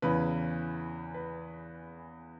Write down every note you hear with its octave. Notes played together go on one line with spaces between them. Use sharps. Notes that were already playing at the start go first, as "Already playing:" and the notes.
E2 C#3 E3 B4
B4